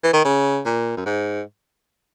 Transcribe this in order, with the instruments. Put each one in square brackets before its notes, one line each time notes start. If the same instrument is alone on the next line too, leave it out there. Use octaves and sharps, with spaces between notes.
[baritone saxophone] E3
D#3
C#3
A#2
F#2
G#2